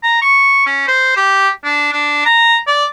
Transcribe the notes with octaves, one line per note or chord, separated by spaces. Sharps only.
A#5
C#6
C#4
C5
G4
D4
D4
A#5
D5